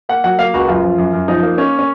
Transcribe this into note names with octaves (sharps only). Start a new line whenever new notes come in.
A#3 F#5
F#3 F#5
A#3 F5
C#2 F#4
F#2 F4
F3
F#2
F#2
F3 D#4
A#3
A#3 C#4
C#4